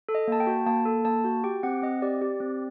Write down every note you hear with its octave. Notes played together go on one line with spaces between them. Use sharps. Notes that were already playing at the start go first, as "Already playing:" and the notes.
A4
D#5
A#3 A5
G5
F#4
A#3 A5
A4
A#3 A5
F#4
G4 G5
C4 F#5
C4 D#5
G4 D5
G4
C4